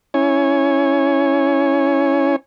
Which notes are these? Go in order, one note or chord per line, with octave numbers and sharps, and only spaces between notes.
C#4 E4 C#5 G#5